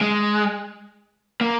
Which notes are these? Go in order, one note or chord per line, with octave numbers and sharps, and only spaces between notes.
G#3
A#3